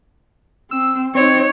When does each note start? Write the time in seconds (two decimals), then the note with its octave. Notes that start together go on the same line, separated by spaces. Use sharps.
0.71 C4 E6
1.15 C4 D#4 C#5